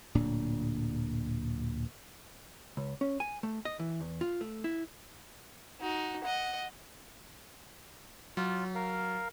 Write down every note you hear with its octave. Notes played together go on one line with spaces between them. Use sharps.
D1 A#2 D4
C#2
C#4
G#5
A3
D#5
E3
E2
F4
A3
E4
D#4 F#4
D#5 F#5
F#3 F4
A#4 F5